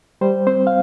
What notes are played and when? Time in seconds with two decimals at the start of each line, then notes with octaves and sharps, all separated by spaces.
0.21 G3 C5
0.47 C4 C5
0.67 F5